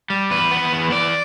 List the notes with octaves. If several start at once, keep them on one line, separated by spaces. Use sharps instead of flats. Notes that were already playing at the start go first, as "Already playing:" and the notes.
G3
E2 B4
B3
E2
E3 D5